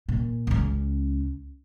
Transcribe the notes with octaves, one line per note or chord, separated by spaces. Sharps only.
A#2
C#2 C#4